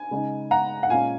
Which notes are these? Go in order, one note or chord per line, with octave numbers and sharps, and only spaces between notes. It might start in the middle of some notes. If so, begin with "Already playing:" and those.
Already playing: G#5
C#3 G#3 D#4
F#5 A#5
F#5
A#2 G#3 C#4 F5 G#5